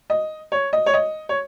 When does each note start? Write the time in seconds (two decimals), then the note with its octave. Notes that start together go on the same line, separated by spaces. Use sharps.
0.10 D#5
0.52 C#5
0.73 D#5
0.86 C#5
0.94 D#5
1.29 C#5